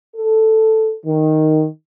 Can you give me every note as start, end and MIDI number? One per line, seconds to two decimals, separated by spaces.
0.16 0.93 69
1.05 1.66 51